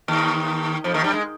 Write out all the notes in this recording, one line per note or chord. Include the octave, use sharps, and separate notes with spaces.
D#2 D#3
F2 F3
D#2 D#3
G2 G3
G#3